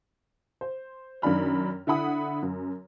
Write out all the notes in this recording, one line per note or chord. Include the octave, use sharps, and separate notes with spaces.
C5
F#2 D#3 D4 B5 F6
D3 E4 F#5 B5 D#6
F#2